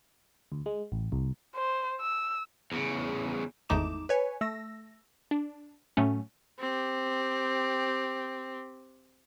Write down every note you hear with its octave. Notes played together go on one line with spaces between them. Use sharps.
D2
G#3
A1
C2
C5
E6
E2 C#3
G#1 E2 A3 D#4 D6 E7
B4 C#5 G#5
A3 E6 A#6
D4
A2 F#3 A3 C#4
C4 G4